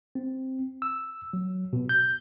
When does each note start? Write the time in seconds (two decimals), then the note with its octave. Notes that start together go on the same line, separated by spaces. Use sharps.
0.15 C4
0.82 E6
1.33 F#3
1.73 B2
1.89 G6